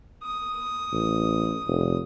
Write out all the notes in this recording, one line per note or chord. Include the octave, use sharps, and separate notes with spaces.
D#6
A1
F1